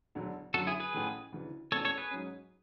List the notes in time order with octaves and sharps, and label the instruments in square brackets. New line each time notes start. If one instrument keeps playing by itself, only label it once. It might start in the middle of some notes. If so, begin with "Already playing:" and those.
[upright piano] E1 D2 D3 F#3
[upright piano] F#2 D3 F#3 [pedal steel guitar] F#4 A4
[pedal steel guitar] E4 G#4
G#4 B4
[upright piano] A1 A2 E3 A3
D2 C#3 E3
[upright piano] E1 E2 B2 A3 C#4 [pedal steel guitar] A4 C#5
[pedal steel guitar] A4 C#5
G#4 B4
[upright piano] G#2 F#3 C#4